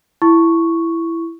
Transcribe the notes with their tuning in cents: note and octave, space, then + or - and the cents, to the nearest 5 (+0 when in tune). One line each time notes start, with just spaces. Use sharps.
E4 +10 C#6 +0